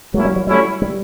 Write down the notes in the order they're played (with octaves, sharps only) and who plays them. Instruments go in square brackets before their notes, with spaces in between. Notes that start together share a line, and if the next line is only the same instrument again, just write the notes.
[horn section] F#3 A#3 C#4 E4 [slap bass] G#3
[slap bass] G3
F#3
[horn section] F#3 A3 C#4 E4 [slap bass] G3
[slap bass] G3